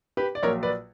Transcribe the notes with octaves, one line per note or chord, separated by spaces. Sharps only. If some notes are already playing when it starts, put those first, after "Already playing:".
G4 B4
D5
A#1 A#2 F#3 A#4 C#5
B4 D5